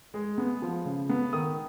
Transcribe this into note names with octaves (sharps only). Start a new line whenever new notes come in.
G#3
B3
F3
C#3
B3
D#3 D#6